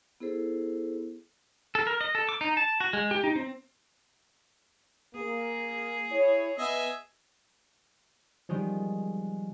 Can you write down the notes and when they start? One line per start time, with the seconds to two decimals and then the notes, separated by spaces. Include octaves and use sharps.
0.20 B3 E4 G#4 A4 C5
1.75 A4
1.87 A#4
2.01 D#5
2.15 A4
2.29 D6
2.41 D#4
2.57 A5
2.80 F#4
2.93 G#3
3.11 G4
3.24 D#4
3.36 C4
5.14 A#3 G#4
6.10 E4 C#5
6.58 B3 D#5 E5 G#5
8.49 D#3 F3 G3 G#3 B3